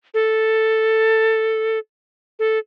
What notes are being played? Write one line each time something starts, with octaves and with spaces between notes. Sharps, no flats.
A4
A4